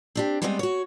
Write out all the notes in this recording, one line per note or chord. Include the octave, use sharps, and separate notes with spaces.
C4 D4 G4
G3 G#3 B3 C4 B4 D#5
F#4 C#5